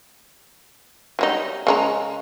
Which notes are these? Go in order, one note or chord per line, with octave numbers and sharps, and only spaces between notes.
F#3 G3 D#4
C#3 G#3 A#5